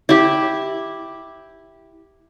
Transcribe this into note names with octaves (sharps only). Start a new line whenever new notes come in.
E4 G4